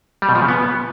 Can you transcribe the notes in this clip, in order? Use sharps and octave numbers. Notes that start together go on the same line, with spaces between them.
G3
B2
F3
C#3
B3